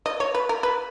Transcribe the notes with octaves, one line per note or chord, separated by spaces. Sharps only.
D#5
C#5
B4
A#4
B4